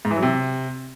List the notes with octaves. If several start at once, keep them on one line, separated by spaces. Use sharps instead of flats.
G#2
E3
F#3
C3